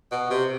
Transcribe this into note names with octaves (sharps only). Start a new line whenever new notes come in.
B2
C3